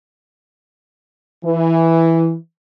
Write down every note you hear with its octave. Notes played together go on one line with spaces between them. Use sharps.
E3